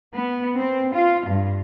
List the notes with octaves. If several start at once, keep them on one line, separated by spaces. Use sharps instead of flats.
B3
C4
F4
G2